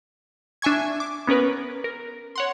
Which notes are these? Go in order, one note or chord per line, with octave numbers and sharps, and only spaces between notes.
D4 E5 G#5 C#6 G#6
D6
B3 C#4 A#4 B4
A#4
C#5 F#5 C6